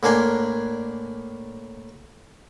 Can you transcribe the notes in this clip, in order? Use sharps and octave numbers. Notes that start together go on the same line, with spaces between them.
A2 A#3 D4 G#5 C6